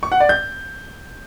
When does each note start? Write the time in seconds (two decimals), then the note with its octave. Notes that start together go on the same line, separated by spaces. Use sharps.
0.03 C#6
0.12 F#5
0.20 D5
0.29 G6